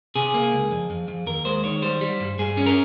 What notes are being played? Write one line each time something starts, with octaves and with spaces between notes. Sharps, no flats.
C3 G#4
A#3
C#2
F2
F2
F2
D#2 A#4
G#3 C5
D#3 C#5
G3 C5
G3
G2
G2 G#4
C#4
A#4